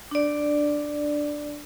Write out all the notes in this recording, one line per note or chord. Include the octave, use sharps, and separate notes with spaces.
D4 D5